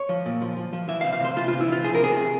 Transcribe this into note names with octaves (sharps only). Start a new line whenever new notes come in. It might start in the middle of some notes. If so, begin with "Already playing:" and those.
Already playing: C#5
F3
A#2
F3
F3
F3
E3 E5
F5
C3
F5
C3 C5
E3 F4
C3 F4
E4
E3 F4
F3 G#4
A#4
C3 G#4
C3